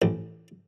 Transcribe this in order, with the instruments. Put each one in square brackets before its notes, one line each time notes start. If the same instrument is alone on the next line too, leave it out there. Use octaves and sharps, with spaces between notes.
[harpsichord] A1